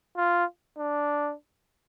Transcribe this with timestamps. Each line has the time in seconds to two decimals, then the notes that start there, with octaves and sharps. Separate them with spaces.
0.17 F4
0.78 D4